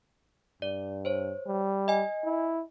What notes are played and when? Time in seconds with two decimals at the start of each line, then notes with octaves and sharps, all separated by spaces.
0.62 G2 D5
1.05 C5 C#5
1.47 G3
1.88 D#5 G#5
2.25 E4